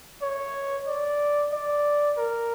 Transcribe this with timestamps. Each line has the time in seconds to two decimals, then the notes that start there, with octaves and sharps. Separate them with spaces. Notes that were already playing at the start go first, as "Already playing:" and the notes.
0.22 C#5
0.87 D5
1.52 D5
2.17 A#4